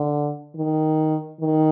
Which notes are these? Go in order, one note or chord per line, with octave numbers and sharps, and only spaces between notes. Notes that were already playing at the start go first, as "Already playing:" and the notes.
Already playing: D3
D#3
D#3